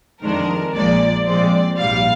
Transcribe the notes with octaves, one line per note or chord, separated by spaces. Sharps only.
F2 D#3 G#3 D4 A#4
A#1 A#2 F3 G#3 D5
A#2 F3 G#3 C4 D5
A#1 G#2 G3 F5